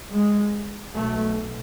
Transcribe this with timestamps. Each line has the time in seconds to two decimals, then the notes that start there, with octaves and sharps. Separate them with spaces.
0.12 G#3
0.93 B1 B2 A3